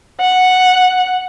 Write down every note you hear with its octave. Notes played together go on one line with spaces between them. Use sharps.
F#5